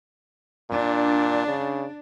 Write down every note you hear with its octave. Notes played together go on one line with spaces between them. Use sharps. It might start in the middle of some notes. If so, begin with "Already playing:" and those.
A#2 D4
C#3